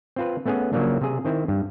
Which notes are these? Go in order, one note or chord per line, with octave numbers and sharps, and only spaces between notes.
C4 F4 B4
A3 B3 C#4 G#4 F#5
C#3 F3 F#3 A#3 D4
C3 G#4
D#3 C4 E4
G2